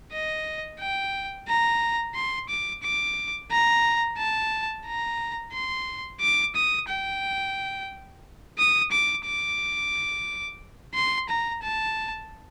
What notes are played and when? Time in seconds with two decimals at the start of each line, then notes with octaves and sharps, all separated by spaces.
0.12 D#5
0.79 G5
1.48 A#5
2.15 C6
2.49 D6
2.83 D6
3.51 A#5
4.18 A5
4.86 A#5
5.53 C6
6.21 D6
6.56 D#6
6.89 G5
8.59 D#6
8.92 D6
9.26 D6
10.95 C6
11.29 A#5
11.63 A5